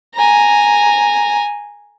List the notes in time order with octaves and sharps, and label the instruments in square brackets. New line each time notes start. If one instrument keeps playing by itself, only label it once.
[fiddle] G#5 A#5